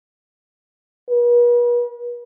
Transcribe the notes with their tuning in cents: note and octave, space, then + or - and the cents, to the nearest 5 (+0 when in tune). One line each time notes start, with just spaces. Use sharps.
B4 -45